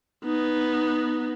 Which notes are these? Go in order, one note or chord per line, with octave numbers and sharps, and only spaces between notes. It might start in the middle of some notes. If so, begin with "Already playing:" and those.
B3 D#4